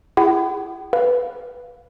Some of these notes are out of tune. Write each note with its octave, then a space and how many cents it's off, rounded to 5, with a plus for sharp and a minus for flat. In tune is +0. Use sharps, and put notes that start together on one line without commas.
E4 +30 G#4 -25 F#5 +45
B4 +0 F5 +0